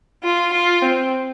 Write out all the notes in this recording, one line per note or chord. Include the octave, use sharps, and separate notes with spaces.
F4
F4
C4